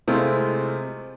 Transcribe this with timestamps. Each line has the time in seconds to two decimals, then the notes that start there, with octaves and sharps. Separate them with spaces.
0.08 C3 G#3 A3 C4 E4 F4